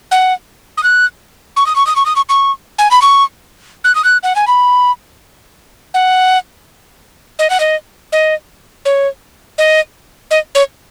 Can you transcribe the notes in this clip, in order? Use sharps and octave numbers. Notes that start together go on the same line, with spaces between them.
F#5
D#6
F#6
C#6
D#6
C#6
D#6
C#6
D#6
C#6
C#6
G#5
B5
C#6
F#6
D#6
F#6
F#5
G#5
B5
F#5
D#5
F#5
D#5
D#5
C#5
D#5
D#5
C#5